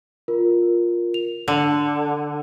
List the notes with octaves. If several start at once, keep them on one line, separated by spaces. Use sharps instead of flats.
F4 A#4
F7
D3